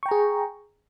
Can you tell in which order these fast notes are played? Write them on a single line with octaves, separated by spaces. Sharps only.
C#6 G5 A#5 G#4